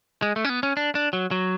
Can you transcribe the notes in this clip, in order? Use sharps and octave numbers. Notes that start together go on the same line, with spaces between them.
G#3
A3
C#4
B3
C#4
D4
D4
F#3
F#3